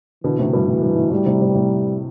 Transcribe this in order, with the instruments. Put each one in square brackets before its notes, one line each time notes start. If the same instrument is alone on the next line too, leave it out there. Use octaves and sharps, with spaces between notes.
[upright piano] B2 D3 [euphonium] E3
[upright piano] A2 C3
G2 B2
[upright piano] A2 [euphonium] E3
[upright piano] G2
A2
[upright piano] A2 [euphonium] G3
[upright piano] A2 C3
A2 C3
A2 C3